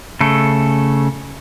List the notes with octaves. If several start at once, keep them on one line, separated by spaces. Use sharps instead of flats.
C#3 A3 A4